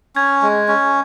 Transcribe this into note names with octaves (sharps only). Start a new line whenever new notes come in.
C#4 G#6
G#3
C#4